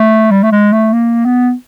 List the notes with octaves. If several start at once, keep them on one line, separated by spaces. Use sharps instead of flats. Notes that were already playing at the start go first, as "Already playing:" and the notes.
Already playing: A3
G3
A3
G#3
A3
A#3
B3